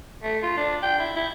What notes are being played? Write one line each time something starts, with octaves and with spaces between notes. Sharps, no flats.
A3
F4
D4
G5
E4
E4